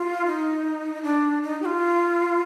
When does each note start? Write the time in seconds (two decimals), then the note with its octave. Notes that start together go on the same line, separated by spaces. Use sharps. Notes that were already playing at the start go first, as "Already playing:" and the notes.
Already playing: F4
0.26 D#4
1.03 D4
1.42 D#4
1.62 G4
1.65 F4